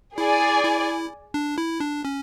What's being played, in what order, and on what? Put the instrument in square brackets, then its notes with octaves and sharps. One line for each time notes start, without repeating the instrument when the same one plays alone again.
[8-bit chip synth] E4 [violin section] G#4 D5 G#5
[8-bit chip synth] E4
D4
E4
D4
C#4